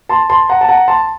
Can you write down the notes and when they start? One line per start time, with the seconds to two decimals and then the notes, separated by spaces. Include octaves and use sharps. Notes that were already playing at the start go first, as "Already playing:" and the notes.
0.09 A5 C6
0.30 A5 C6
0.49 F#5 A#5
0.61 A5
0.68 F#5 A#5
0.88 A5 C6